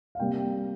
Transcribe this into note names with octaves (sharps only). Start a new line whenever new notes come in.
F5
C3 G3 A#3 G5